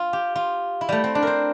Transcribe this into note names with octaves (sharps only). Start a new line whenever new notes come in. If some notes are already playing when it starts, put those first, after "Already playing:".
Already playing: F4
G4
F4
E4
G3 A3
C4
D4
A#4 C5